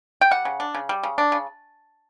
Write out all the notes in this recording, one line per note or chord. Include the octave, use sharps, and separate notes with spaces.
G5
G3 F#5
C#3
D4
C#3
G3
C#3
D4
C#3